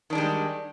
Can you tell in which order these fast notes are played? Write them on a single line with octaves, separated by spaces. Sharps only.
D#3 D4 G#3 G3